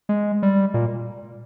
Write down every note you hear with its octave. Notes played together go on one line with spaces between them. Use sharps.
G#3
G3
A#2